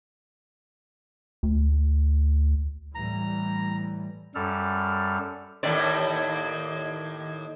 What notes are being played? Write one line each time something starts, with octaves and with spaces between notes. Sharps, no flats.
D2
A2 E3 G3 A#5
F#2 G3 A4 F6
D#2 A2 D5